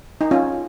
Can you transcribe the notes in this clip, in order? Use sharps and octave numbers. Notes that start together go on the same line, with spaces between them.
D#4
C#4 F4